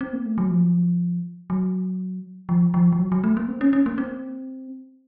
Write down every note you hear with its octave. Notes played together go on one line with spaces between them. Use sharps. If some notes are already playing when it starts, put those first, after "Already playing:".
C4
A#3
A3
F#3
F3
F#3
F3
F3
F3
F#3
F#3
A3
A#3
C4
C#4
C#4
A#3
C4